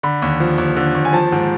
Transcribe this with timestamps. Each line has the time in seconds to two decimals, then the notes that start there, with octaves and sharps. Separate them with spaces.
0.03 D3 B5
0.22 D#2
0.40 F3
0.58 D#2
0.77 D3
0.95 D#2
1.05 G#5
1.13 F3 A5
1.32 G#2